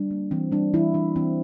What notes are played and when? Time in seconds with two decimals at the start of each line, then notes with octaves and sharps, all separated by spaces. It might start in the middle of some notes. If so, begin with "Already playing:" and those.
Already playing: G3 D4
0.11 A#3
0.31 E3 C4
0.52 G3 D4
0.73 E3 E4
0.94 E3 D4
1.16 E3 C4